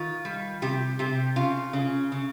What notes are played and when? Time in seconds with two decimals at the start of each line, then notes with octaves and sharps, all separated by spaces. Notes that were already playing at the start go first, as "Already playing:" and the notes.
Already playing: D#3 F4
0.25 G3
0.62 C3 G4
0.99 C3 G4
1.36 C#3 F4
1.73 C#3 C#4
2.12 C#3